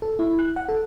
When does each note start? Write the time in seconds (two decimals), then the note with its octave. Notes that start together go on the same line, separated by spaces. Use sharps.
0.02 A4
0.19 E4
0.39 F#6
0.56 F#5
0.69 A4